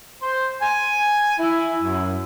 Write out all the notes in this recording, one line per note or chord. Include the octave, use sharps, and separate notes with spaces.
C5
G#5
E4
F#2